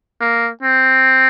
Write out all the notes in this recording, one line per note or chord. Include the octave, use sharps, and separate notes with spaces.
A#3
C4